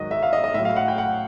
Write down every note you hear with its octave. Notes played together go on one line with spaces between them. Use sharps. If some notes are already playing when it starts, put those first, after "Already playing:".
Already playing: G#2 D#3 F#3 D#5
E5
F5
D#5
D#5
A2 E5
F#3
F5
F#5
G5
F#5